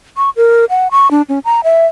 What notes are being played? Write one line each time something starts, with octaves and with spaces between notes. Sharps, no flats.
C#6
A#4
F#5
C#6
D4
C#4
A#5
E5